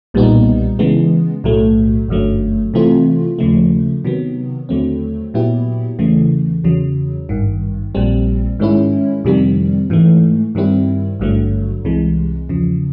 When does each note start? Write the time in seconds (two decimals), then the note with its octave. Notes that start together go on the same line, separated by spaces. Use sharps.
0.14 B1 A#2 G3 B3 D#4
0.79 C#3 E3 G#3 B3
1.44 B1 A2 F#3 A3
2.09 G1 F#2 D3 F#3 A3
2.74 C3 E3 A3 C4 F4
3.39 D#2 C#3 F3 A3
4.05 C3 D#3 F#3 B3
4.69 D#2 D3 F#3 A3 C4
5.34 A#2 F#3 B3 E4 G4
5.99 E2 C#3 E3 A3
6.64 E2 C#3 F#3
7.29 G#1 G2 D#3
7.95 A#1 A#2 G3 C4
8.59 G#2 D#3 G#3 C#4 E4
9.24 F2 C3 D#3 G3 C4
9.90 G#2 E3 A3
10.55 G2 D#3 G3 C4 E4
11.20 G#1 G2 D3 F#3 A3
11.85 C2 C3 E3 G#3
12.49 E2 C#3 F3